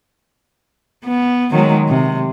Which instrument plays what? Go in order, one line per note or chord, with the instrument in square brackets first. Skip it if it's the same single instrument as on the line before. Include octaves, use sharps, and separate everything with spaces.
[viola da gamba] B3
D#3 F#3 G#3
C3